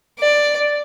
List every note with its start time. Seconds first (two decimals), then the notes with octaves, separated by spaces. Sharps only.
0.19 D5